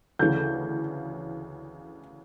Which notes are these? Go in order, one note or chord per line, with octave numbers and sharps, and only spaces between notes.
D2 C#3 E3 G6